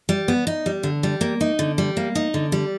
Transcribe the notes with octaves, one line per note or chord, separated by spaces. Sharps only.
G3
B3
D#4
G3
D3
G3
A#3
D#4
D3
G3
A#3
D#4
D3
G3